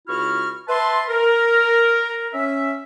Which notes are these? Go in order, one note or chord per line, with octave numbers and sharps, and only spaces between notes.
C#2 E4 F#4 C#6 F6
B4 E5 A5 C6
A#4
C#4 E5